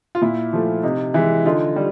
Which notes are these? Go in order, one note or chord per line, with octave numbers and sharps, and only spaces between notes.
F4
A#2 E4
F3 A3
C3 D#4
E3 G#3 E4
D3 D#4 F4
G3